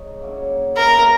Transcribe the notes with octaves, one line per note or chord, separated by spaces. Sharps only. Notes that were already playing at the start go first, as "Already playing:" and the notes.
Already playing: G#3 D#4 G#4 C#5
C#3 F#3 A#3 E4
B2 A#3 E4 A#4 B4